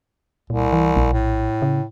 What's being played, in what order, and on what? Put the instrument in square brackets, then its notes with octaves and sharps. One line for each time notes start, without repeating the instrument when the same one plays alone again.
[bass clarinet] C2 [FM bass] A#2
[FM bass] E3
A#1
[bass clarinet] A2
[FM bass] C#3